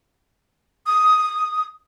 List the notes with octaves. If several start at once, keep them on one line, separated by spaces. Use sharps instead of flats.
D#6